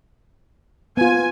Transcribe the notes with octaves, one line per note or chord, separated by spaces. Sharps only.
B3 F4 G#5